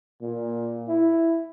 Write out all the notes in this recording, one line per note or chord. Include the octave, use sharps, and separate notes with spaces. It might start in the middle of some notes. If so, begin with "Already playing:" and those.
A#2
E4